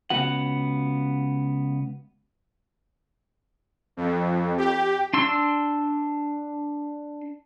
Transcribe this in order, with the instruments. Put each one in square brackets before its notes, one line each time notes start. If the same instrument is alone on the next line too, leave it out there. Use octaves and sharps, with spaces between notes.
[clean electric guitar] C#2 B3 F#4 F#5
[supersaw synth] F2
G4
[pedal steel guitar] D4 C6 E6